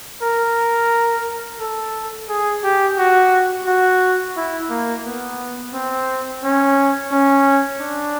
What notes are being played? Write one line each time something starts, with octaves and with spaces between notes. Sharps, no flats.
A#4
A4
G#4
G4
F#4
F#4
E4
A#3
B3
C4
C#4
C#4
D4